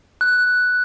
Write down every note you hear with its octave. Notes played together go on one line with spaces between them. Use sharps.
F#6